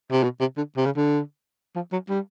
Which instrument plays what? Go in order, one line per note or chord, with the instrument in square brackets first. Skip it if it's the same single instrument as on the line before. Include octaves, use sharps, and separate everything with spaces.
[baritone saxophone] C3
B2
C3
D3
C3
C#3
D3
F3
F#3
G3